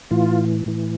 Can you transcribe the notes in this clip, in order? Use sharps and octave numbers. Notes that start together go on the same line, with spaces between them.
A2 E3 F4
A2 E3